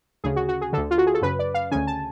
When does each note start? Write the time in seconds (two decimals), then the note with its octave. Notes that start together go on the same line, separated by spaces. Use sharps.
0.24 D2 C#3 G#4
0.36 F#4
0.49 F#4
0.61 G#4
0.73 D2 D3 A4
0.91 F4
0.98 F#4
1.07 G#4
1.14 A4
1.22 F#2 C#3 B4
1.39 D5
1.54 F5
1.71 D2 C#3 G#5
1.87 A5